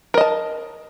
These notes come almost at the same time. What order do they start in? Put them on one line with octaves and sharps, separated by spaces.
A#4 D#5 A5